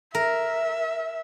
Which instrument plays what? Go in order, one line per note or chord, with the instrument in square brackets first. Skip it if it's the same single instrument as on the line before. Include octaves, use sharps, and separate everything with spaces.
[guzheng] A#4 [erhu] E5